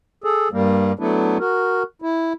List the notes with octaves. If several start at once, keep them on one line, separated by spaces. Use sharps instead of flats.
G#4 A4
G2 G3 A#3
F#3 A3 B3 D4 E4
F#4 A#4
E4